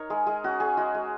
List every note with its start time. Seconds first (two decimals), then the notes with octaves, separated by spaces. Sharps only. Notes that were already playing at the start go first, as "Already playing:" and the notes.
Already playing: D#4 A#4 C#5
0.10 G#3 G#4
0.26 G#3 G#4
0.44 C#4 F#4
0.60 C#4 G#4
0.77 G#3 F#4
0.95 G#3